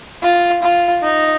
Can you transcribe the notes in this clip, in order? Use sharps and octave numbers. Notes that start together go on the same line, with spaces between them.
F4
F4
D#4